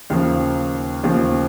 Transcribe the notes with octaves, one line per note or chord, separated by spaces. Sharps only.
D#2 C#3 F3 A#3
D#2 C#3 F3 A#3